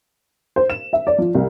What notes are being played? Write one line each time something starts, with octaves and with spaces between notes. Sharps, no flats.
C5
E7
E5
D5
F3
C2